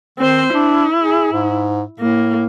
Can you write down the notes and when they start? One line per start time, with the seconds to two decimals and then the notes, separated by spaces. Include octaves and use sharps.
0.18 D#3 C4 C5
0.54 D4 E4
1.01 G#4
1.32 G#2
2.00 A2 A#3